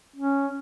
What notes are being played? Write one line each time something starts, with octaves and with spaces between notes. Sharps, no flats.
C#4